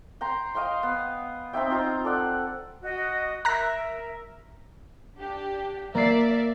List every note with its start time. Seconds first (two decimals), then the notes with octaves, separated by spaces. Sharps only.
0.21 G5 A#5 C6
0.55 D#5 F5 G5 C6
0.83 B3
1.53 C4 D#4 E5 G5
1.70 D#4 F4 G5 A#5
2.05 A4 D5 F#5
2.82 F#4 D#5
3.45 A#4 E5 A#5 F#6 A#6
5.17 D4 G4
5.95 A#3 A#4 D5 E5 C7